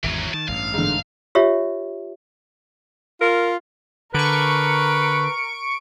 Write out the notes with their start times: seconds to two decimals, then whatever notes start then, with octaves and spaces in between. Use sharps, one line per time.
0.04 G#1 E2 E3 F#3
0.34 D#3 A5
0.48 A1 G2 F5
0.74 G#2 D3
1.35 F4 G4 C#5 E5
3.21 F4 A#4
4.14 D3 A#4 B4 C#6 D7